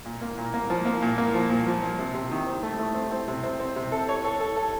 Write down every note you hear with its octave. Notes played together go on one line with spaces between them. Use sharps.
A#2
A#3
A#2
A#3
F3
A#3
A#2
A#3
F3
A#2
F3
F3
C3
C3
D#3
C4
A3
A3
C4
C4
C3
C4
C4
C3
A4
C#5
A4
A4
A4